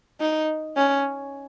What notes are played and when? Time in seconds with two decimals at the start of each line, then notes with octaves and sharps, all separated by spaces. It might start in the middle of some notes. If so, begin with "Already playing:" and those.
0.20 D#4
0.77 C#4